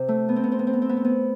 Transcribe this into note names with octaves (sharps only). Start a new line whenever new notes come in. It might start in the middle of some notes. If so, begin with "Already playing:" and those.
Already playing: C3
A3
B3
C4
B3
C4
B3
C4
B3
C4
B3
C4
B3